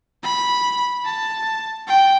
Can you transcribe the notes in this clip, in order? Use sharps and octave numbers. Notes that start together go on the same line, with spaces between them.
B5
A5
G5